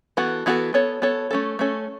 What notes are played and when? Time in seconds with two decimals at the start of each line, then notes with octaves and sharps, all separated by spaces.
0.17 E3 B3 F#4 A4
0.46 E3 B3 F#4 A4
0.74 B3 A4 C#5
1.02 B3 A4 C#5
1.31 A3 C#4 A4
1.59 A3 C#4 A4